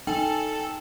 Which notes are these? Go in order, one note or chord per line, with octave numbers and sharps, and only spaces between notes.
D#4 A4 G5 G#5